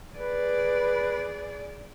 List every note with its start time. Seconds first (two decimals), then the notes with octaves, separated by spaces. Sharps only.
0.16 G#4 B4 D5